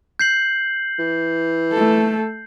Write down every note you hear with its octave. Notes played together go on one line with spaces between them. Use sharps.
G6 C7 F#7
E3
A3 A4